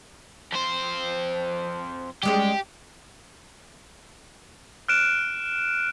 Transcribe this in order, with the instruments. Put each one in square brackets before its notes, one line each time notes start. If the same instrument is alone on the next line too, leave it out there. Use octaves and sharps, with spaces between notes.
[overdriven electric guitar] F2 C5
[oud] G3 G#3 C#4 [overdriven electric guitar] G4
[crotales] F6 F#6 D7 E7